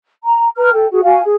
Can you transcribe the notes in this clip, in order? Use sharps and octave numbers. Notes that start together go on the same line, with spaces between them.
A#5
B4 A#5 F6
A4 G5
F#4 G#4
F#4 F5 G#5
G#4